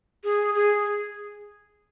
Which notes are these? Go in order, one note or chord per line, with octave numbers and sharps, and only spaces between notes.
G#4
G#4